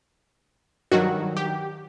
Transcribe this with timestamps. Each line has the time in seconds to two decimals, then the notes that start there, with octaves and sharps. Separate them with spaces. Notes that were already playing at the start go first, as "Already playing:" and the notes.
0.92 G2 D#3 F#3 F#4
1.37 G4